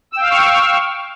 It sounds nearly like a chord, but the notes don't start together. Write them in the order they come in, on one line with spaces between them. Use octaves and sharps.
E6 G5 F5 F6 C#6